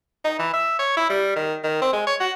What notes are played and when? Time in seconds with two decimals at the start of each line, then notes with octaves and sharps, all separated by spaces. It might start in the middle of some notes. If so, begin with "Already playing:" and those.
0.25 D#4
0.39 E3
0.54 E5
0.79 C#5
0.97 E4
1.10 G3
1.36 D#3
1.64 D#3
1.82 C4
1.93 G#3
2.07 C#5
2.20 F#4